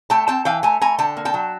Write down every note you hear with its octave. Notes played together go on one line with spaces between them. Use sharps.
A3 G5 A5
C4 G5 A5
E3 F5 G5
A3 G#5 A#5
A3 G#5 A#5
D3 G5 A5
A#3
G5 A5
F#3